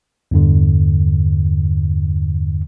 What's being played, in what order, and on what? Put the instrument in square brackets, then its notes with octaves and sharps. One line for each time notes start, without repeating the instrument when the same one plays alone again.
[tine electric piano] E2 G2 D3